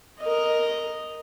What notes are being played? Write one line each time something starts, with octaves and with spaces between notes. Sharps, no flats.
A#4 D#5